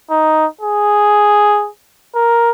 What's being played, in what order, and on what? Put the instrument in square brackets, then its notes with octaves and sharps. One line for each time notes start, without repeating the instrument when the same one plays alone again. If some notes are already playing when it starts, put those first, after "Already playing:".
[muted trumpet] D#4
G#4
A#4